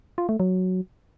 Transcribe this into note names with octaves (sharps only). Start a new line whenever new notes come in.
F4
A3
F#3